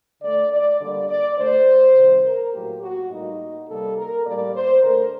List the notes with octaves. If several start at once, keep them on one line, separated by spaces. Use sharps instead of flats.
D3 A3 D5
D5
D3 G3 A#3 D5
D5
D3 A3 C5
C3 D#3 G3
A#4
A2 F#3 A#3 G4
F#4
A2 G3 A#3 D#4
C3 G3 A#3 A4
A#4
A2 G3 A#3 D5
C5
D3 A3 A#4